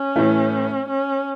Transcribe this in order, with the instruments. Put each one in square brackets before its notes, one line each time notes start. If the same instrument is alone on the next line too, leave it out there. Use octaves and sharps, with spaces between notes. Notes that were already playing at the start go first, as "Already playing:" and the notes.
Already playing: [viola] C#4
[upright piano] A2 E3 A3
[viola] C#4